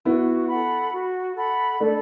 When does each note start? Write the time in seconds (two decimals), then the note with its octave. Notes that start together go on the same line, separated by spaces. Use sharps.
0.05 B3 E4 F#4
0.48 A4 F#5 B5
0.92 F#4
1.36 A4 F#5 B5
1.80 A3 D4 A4